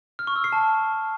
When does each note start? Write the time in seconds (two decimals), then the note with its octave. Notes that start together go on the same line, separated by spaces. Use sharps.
0.19 F6
0.27 C#6
0.36 E6
0.44 C7
0.53 A5